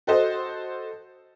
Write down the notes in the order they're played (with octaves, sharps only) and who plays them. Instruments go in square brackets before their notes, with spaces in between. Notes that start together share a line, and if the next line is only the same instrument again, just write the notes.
[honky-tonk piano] F#4 A4 C5 D#5